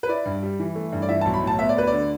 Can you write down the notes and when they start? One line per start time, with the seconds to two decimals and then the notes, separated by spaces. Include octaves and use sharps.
0.03 B4
0.09 E4 D5
0.25 G2
0.43 G3
0.59 E3
0.75 A3
0.92 G2
1.02 D5
1.09 E3 E5
1.21 A5
1.25 B1
1.34 B5
1.43 A2 A5
1.59 B3 E5
1.69 D5
1.76 D2 B4
1.87 D5
1.92 D3